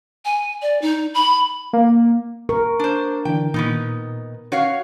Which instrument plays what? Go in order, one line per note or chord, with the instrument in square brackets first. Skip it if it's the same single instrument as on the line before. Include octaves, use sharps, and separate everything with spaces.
[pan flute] G#5
D5
D#4
B5
[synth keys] A#3
[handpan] A#4 [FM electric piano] C#6
[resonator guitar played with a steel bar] D4 C5
[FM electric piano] D3 E3 D4 [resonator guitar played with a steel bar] G5
[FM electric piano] A#2 [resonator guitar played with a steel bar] D#3 B3 D#4
[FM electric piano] C#4 F#5 C7 [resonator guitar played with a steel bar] F#4 C#5 F5